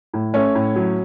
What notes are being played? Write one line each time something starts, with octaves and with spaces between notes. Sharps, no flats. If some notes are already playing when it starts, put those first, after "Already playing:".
A2
A3 C#4 C#5
A2
F#3